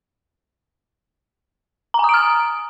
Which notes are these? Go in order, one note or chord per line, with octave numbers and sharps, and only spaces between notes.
G#5 A#5 D#6 F6 D7